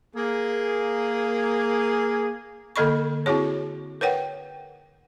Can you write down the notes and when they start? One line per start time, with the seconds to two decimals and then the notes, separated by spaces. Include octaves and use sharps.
0.16 A#3 G#4
2.76 D3 A#3 A4 D#5 B5 C#6
3.26 C4 E4 F#4 G#4 C#5
4.01 A#4 B4 C#5 F#5 G5